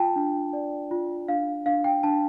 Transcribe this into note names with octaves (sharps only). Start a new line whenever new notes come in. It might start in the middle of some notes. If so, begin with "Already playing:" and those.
Already playing: F4 G5 A5
D4
D5
F4
D4 F5
D4 F5
G5
D4 A5